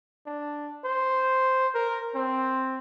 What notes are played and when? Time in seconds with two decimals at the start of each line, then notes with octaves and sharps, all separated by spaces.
0.26 D4
0.85 C5
1.75 A#4
2.15 C4